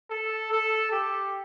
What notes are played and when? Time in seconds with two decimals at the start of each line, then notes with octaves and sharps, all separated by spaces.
0.10 A4
0.51 A4
0.91 G4